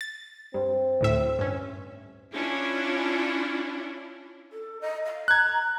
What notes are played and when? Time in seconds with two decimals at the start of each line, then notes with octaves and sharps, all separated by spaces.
0.01 A6
0.54 G2 C4
1.01 D2 A2 E5
1.39 G2 C#4
2.33 C#4 D4 E4 F4
4.52 A4
4.81 D#5
5.05 F5
5.28 A#5 F#6 G#6